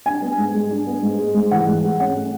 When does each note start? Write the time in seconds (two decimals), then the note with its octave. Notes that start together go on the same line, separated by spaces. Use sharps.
0.06 D4 G#5
0.22 B3
0.38 G#2
0.54 G#3
0.71 D4
0.87 B3
1.02 G#2
1.19 G#3
1.34 G#2
1.51 E3 F#5
1.67 G#2
1.84 G#3
2.00 C#4 F#5
2.15 A3